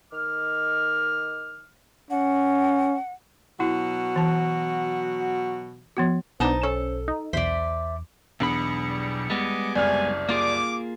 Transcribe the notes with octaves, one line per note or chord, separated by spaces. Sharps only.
D#3 D#5 D6 F6
C#4 F#5
B2 F#3 E4 F#4
E3 A5
F3 B3 F#4
B1 B3 D4 D#4 C5 A5 A#5
C#4 A4
D#4
B1 E2 C5 D5 E5 B6
B1 E2 D4 B5 C#7
G3
G3 G#3 B3 D#5 G#5 D6
F#1 C2 D5 G#5 F6
A#3 F4 G#4 D6